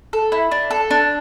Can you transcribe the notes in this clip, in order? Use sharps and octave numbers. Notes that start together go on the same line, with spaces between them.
A4
E4
D4
A4
D4